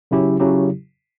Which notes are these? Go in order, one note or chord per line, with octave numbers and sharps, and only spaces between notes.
C#3 F#3 C#4 E4 G4
C#3 F#3 C#4 E4 G4